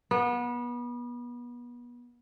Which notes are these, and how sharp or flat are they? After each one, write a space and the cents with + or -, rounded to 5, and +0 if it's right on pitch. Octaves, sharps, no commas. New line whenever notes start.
B3 -30